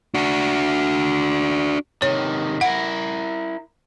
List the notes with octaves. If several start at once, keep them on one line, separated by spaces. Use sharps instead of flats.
D4 F#4
C3 D#3 C#5
E4 A#4 F#5